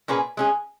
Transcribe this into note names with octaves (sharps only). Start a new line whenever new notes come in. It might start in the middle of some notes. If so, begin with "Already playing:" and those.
A#2 A#3 C#4 G#4 B4
G#3 C#4 G#4